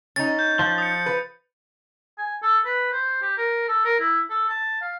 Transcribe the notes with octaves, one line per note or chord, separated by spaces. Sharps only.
C#4 D#4 A6
G6
F3
D#6 C#7
B4
G#5
A4
B4
C5
G4
A#4
A4
A#4
E4
A4
A5
F5